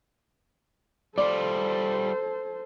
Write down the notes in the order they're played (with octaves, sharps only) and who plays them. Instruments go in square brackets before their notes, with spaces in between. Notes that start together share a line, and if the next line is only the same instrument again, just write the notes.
[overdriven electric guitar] G3 F4 [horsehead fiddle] A4 C5 [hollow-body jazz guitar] D5